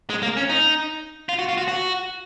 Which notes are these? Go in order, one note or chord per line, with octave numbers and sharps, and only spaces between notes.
G#3
A#3
C#4
D#4
F4
F#4
F4
F#4
F#4